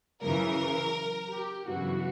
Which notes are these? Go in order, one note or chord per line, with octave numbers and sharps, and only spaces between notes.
F#2 C#3 E3 A#4
G4
G1 F#2 C#3 E3 F#4